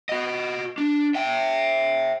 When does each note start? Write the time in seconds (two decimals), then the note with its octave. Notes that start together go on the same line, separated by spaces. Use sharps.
0.09 F#4 D#5
0.78 D4
1.15 E5 G5